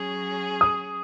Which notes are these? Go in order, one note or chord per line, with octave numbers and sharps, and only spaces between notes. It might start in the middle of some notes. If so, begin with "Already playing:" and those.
Already playing: F#3 C#4 G#4
D#6